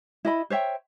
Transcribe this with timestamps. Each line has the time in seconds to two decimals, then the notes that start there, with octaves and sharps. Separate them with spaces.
0.25 E4 D#5 B5
0.50 C5 C#5 E5 G5